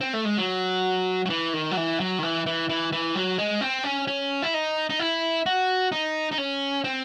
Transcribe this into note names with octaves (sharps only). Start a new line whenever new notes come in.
C4
A3
G#3
F#3
F#3
E3
D#3
F#3
E3
F#3
D#3
E3
E3
E3
E3
F#3
G#3
C4
C#4
C#4
E4
D#4
D#4
E4
F#4
D#4
D#4
C#4
C4